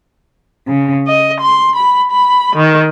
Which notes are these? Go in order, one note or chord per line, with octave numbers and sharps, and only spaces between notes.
C#3
D#5
C6
B5
B5
D#3